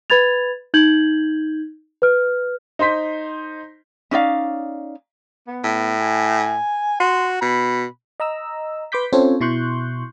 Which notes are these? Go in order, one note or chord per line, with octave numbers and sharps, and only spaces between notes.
B4 B5 G#6 A6 F7
D#4 G6 G#6 F#7
B4 F6
D#4 C5 C6 B6
C#4 D#4 D5 F5
B3
A2
G#5
F#4 C6
B2 B5
D#5 A#5 E6
B4 C6 D6 G6 B6
C4 C#4 F4 A4 C5 C#5
B2 E4 C6 C#6 F#6 G6